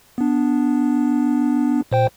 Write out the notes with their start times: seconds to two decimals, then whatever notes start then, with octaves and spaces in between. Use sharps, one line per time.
0.18 B3 D4
1.91 A#2 C5 G5